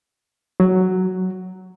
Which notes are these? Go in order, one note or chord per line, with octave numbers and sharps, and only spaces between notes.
F#3